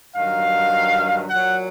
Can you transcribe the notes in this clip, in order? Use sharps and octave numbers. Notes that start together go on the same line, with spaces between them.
G2 D#3 F#3 F5
A#2 F#3 F#5